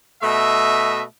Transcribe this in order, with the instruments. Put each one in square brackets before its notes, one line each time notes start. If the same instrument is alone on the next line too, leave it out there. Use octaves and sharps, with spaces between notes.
[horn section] B2 A3 D#5 E5